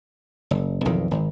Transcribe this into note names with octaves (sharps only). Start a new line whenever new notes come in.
F#1
B1 F2 D#3 E3
G#1